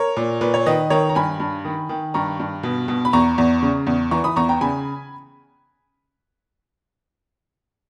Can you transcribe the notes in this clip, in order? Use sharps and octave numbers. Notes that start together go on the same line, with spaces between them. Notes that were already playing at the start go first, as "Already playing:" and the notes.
Already playing: A#4 C#5
A#2
A#2 B4
C#5
D#3 B4 D#5
D#3 A#4 C#5
A#5
G2 G#5 B5
G2
D#3
D#3
G2 A#5 C#6
G2
B2
B2
B5
E2 A#5 C#6
E2
C#3
E2
E3 A#5 C#6
B5 D#6
E2 A#5 C#6
G5 A#5
C#3 G#5 B5